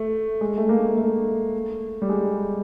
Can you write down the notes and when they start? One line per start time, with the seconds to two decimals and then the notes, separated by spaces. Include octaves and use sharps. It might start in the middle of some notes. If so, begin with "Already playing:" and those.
Already playing: A3
0.41 G#3
0.58 A3
0.69 A#3
0.98 A3
2.02 G3
2.09 G#3